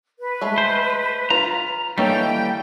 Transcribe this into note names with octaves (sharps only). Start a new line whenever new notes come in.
B4
G#3 A3
C5
F4 A#5
D#3 E3 G3 A#3 C#4 A4 G5